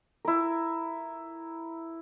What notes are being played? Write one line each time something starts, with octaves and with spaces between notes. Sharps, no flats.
E4 A#4